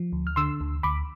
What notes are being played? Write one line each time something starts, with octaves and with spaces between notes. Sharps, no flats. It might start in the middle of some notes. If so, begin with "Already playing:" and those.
Already playing: F3
D2
F6
D3 C6 E6
D2
D2 B5 D6